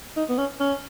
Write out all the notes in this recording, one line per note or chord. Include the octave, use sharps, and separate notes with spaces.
D#4
B3
C#4
C#4